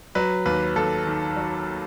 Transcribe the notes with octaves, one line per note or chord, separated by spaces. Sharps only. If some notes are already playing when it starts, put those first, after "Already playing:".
F#3 B4
D#2 B4
D#2 A4
D#3
F#3